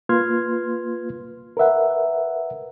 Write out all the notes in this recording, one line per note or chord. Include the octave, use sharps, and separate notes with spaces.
A#3 F4 B4 C6 F6 G#6
A#4 B4 E5 F#5